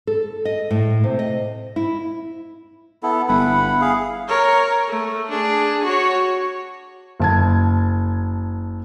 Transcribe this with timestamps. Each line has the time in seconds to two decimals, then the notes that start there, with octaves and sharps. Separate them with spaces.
0.07 A4
0.45 D#5
0.71 A2
1.04 C3
1.19 D#5
1.76 E4
3.03 B3 E4 A4
3.28 G1 E4 F#5 B5
3.81 G#4 F5
4.28 A#4 C#5
4.88 A3
5.30 D4 G#4
5.84 F#4 C#5
7.20 F#1 A5 G#6